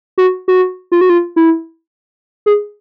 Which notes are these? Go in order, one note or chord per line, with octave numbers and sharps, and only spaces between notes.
F#4
F#4
F4
F#4
F4
E4
G#4